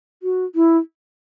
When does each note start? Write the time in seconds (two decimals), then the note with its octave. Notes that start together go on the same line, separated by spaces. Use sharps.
0.23 F#4
0.55 E4